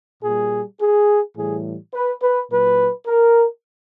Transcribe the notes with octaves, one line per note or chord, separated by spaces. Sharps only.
A#2 G3 G#4
G#4
A2 E3 G3 G#4
B4
B4
A#2 F#3 B4
A#4